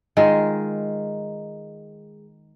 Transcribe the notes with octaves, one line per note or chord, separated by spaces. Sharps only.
D#3 G#3 F4